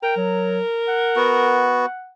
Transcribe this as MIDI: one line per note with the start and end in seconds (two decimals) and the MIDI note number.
0.03 1.69 70
0.03 0.15 79
0.17 0.60 54
0.88 2.11 78
1.16 1.86 59
1.16 1.86 66